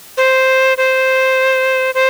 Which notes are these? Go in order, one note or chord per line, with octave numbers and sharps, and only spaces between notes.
C5
C5
C5